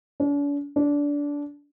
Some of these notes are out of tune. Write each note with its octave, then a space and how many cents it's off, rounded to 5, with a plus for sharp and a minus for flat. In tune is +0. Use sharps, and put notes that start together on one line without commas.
D4 -45
D4 -20